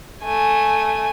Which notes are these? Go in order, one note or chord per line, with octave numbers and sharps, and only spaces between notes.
A3 G#5